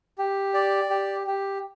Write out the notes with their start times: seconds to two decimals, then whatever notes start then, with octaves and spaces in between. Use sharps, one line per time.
0.18 G4
0.54 D5
0.90 G4
1.27 G4